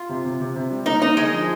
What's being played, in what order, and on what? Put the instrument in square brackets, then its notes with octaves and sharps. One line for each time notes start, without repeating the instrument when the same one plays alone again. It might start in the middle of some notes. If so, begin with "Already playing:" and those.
Already playing: [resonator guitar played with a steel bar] F4
[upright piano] C3
C3
C3
C3
G3
[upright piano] A#3 [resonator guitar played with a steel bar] D#4
[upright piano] A#3 [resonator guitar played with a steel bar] D#4
[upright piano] D3 [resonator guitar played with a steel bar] G#3
[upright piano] F3